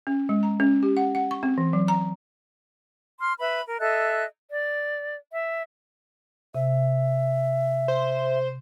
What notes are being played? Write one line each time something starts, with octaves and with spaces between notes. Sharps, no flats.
C#4
G#3
A#5
C#4
G4
F#5
F#5
C#6
C4
E3
F#3
A#5
C6 F6
B4 E5 B5
A#4
A4 D#5 E5 F#6
D5
E5
C3 E5
C5